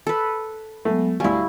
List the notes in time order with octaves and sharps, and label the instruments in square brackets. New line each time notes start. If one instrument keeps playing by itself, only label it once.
[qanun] A4 B4
[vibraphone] F#3 G#3 B3 [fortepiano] A3
[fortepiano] D2 F#3 G#5 [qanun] G3 E4 [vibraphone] F5 C#6